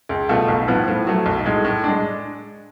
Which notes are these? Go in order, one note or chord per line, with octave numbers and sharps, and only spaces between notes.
C#2
B2 A3 F4
B1
A2 F3 B3
A2
F#3 A3
B1
A2 G#3
A2
G#3 D4